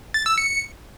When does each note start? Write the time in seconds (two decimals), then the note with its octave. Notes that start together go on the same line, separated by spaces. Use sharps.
0.14 A6
0.26 E6
0.38 C#7